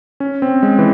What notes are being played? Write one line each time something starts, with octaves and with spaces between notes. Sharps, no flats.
C#4
C4
G#3
E3